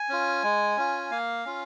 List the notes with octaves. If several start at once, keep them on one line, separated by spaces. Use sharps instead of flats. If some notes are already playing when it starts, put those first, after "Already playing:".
Already playing: G#5
C#4 F4
G#3
C#4 F4
A#3 F5
C#4 F4